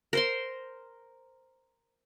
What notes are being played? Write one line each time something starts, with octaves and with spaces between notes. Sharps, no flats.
A#4 C5 C6